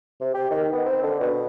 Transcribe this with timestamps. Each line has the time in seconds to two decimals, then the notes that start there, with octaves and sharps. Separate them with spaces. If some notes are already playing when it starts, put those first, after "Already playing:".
0.20 C3
0.34 G4
0.50 D#3
0.72 B3
0.85 C4
1.03 D3
1.20 B2